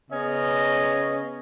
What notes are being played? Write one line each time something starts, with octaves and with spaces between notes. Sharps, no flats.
C#3 B3 C#4 C#5 D#5